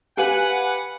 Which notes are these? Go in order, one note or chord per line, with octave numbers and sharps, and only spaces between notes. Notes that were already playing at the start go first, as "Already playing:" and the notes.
G4 B4 F5 F#5 G#5